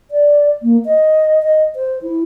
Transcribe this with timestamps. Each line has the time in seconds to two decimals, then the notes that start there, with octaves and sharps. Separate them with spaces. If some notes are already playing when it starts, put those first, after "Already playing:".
0.11 D5
0.63 A#3
0.85 D#5
1.43 D#5
1.75 C5
2.02 E4